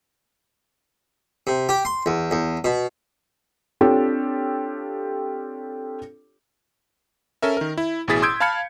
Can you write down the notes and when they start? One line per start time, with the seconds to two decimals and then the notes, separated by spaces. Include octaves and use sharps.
1.47 C3
1.69 G4
1.85 C6
2.06 E2
2.31 E2
2.64 B2
3.81 C4 D4 F4 G4 A4 C#5
7.42 C#4 A4 A#4 E5
7.57 D#3 A#4
7.78 E4
8.08 A1 B2 E4 G#4 A6 B6
8.22 C6 D#6 E6 G6 G#6 D7
8.40 F5 A5 B5 F6 G#6 C#7